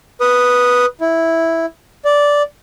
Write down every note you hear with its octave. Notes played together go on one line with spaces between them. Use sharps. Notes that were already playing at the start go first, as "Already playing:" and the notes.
B4 D#6
E4
D5